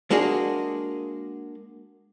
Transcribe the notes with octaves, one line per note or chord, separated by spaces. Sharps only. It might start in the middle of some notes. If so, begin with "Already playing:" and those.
G#3 A#3 D4 F#4 G#4